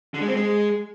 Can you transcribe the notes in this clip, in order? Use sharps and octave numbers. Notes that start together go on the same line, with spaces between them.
D3
G#3
C4
G#3